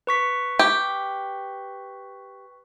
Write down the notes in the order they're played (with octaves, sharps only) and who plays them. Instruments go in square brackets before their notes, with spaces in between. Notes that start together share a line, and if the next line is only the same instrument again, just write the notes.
[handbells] B4 C#6 B6
[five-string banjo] G4